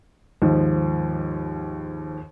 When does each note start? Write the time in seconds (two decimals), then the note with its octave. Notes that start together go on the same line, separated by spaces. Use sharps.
0.42 D#2 G#2 F3